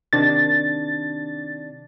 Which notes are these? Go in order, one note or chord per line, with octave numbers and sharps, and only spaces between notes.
C3 D#3 D4 A6